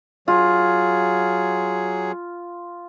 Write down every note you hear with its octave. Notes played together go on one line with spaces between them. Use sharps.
F#3 F4 G#4